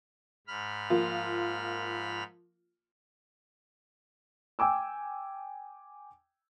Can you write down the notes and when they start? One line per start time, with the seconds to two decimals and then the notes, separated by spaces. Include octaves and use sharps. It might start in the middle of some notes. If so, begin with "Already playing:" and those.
0.47 G#2 B5 F6
0.90 F3 A#3 F4
4.59 G5 G#5 D6 E6